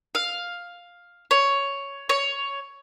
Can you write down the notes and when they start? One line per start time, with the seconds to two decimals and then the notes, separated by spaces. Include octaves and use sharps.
0.15 F5
1.31 C#5
2.09 C#5